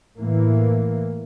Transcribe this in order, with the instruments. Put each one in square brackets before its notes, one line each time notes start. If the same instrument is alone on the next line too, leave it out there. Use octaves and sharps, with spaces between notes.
[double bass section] A2 E3 A#3